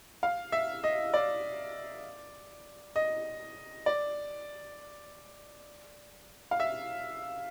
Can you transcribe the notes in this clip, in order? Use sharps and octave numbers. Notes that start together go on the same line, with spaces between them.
F5
E5
D#5
D5
D#5
D5
F5
E5